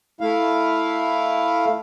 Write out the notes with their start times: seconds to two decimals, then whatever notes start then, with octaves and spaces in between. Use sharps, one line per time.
0.21 A3 E4 F5